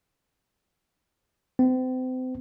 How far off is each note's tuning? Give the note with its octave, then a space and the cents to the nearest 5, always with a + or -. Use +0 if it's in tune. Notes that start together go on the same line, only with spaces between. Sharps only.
C4 -35